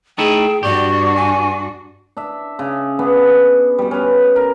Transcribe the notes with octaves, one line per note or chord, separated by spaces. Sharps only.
A3 D#4 E4 G#4 G5
G2 D4 F#4 G4 D5 C#6
G#5
D4 E5
C#3
B3 D4 G#4
B2 G3
C#4 B4
A#4